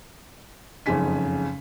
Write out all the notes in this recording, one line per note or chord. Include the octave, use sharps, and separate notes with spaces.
F#1 F2 G#2 C#3 G#5 B6